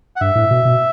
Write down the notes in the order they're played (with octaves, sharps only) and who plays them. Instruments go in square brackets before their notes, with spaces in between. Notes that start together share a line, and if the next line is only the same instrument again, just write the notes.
[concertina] F#5
[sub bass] G2 [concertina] E5
[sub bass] A2
B2
B2